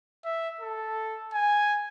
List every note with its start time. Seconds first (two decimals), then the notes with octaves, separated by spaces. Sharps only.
0.25 E5
0.61 A4
1.34 G#5